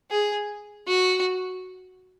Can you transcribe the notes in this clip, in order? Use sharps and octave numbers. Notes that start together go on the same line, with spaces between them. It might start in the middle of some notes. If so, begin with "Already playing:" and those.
G#4
F#4